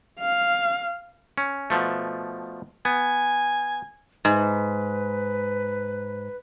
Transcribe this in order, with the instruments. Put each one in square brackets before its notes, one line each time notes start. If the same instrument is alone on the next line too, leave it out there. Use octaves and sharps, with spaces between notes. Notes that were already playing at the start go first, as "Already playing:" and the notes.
[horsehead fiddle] F5
[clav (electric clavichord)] C#4
B2 F3 A3
[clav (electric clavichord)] B3 [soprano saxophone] G#5
[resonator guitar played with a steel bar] G#2 [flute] B4